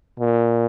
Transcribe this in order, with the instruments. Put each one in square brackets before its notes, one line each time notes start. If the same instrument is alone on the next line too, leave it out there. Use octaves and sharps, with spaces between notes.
[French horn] A#2